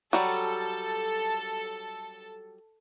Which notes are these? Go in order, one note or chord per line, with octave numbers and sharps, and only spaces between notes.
F#3 G3 A4